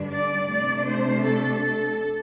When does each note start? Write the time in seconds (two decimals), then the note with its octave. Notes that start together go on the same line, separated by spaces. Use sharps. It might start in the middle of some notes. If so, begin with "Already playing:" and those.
Already playing: G2 D3 G3 D4
0.11 D5
0.49 C3 A3 D4 D5
0.86 C5
1.24 A4
1.61 A4